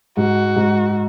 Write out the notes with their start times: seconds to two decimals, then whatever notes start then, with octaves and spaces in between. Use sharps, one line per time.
0.17 G#2 F#4
0.56 G#2